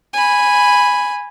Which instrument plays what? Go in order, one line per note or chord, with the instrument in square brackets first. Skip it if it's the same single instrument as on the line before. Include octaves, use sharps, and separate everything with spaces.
[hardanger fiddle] G#5 B5